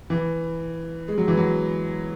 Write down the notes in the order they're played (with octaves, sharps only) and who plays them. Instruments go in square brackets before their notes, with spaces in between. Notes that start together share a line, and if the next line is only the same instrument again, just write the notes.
[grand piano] E3
G#3
F#3
E3
F#3